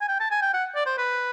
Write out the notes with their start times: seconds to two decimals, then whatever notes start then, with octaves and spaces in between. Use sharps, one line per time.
0.01 G#5
0.08 G5
0.20 A5
0.31 G#5
0.42 G5
0.54 F#5
0.75 D5
0.86 C5
0.98 B4